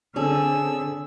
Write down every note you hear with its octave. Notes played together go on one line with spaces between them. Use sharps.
D3 C4 C#4 G#4 A4 E6